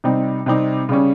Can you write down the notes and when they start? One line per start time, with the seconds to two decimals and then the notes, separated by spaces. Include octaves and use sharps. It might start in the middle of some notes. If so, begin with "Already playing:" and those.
0.04 C3 G3 C4 D#4
0.46 C3 G3 C4 D#4
0.89 C#3 G3 C#4